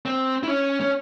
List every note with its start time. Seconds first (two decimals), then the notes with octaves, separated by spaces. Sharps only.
0.06 C4
0.43 E4
0.48 C#4
0.81 C#4